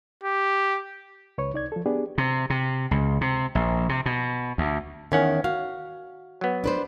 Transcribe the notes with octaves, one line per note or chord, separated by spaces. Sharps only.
G4
C#2 B4 C#5 C#6
C2 D#4 D5 G#6
F3 A4
B3 D4 G4 G#4 D5
C3
C3
C#2
C3
A#1
C3
B2
D2
E2 D#3 C#4 F#5
F#4 F5
F#3 B3
D4 B4 C5